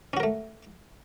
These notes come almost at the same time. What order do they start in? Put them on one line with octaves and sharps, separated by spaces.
C#4 F#4 A#4 A3